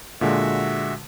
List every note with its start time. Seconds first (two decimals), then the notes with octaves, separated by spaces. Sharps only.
0.21 A#2 D3 G#3 F#4 E5